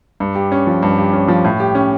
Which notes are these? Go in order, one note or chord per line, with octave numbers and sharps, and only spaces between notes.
G2
G4
C#4
F3
G2
G4
C#4
F3
A2
G4
C#4